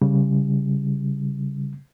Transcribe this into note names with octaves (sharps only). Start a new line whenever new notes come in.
C#3 G3